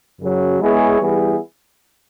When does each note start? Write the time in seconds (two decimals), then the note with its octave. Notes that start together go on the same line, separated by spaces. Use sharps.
0.19 F#2 C#3 F#3
0.59 G#3 B3 E4 G#4 C#5
1.00 E3 G3 B3 E4 G#4